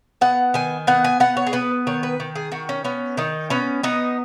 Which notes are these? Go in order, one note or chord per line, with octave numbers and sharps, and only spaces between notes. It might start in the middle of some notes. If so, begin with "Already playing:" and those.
B3 F#5
D#3 G#5
B3 F#5
G#5
B3 F#5
C#5
G#4
B3 B4
D#3 C#5
B4
D#3
G#4
D#3 F#4
C#4
B3 C#4
D#3 D#4
B3 C#4
B3 D#4